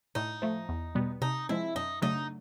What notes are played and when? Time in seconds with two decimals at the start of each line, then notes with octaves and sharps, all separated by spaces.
0.15 A2 D#4
0.42 F3 A3
0.69 E2
0.95 B2 G3 B3
1.22 C3 D#4
1.49 F3 G#3 C4 E4
1.75 F#2 D#4
2.02 C#3 F#3 A3 D4 D#4